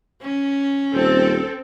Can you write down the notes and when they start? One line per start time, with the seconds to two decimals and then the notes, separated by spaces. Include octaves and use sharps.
0.22 C#4
0.94 D#1 C4 A4